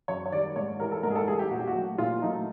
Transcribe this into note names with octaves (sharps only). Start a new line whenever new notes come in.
F#2 C#5
C#5
D#3 G3 D5
G#2 C#5
E3 G3 A#4
A4
G#2 A#4
G#4
A4
E3 G3 G#4
G4
A#2 F#4
G4
F#4
F#3 A3
A#2 F4
F#3 A3 D#4